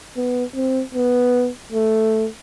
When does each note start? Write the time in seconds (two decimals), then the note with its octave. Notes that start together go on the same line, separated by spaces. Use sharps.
0.17 B3
0.55 C4
0.95 B3
1.72 A3